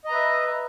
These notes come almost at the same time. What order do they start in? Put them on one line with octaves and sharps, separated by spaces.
D#5 A#5 B4 E5